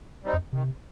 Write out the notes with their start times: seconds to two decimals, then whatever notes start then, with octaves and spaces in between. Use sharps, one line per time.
0.24 G3 C4 D#4
0.33 F2
0.53 C3 D#3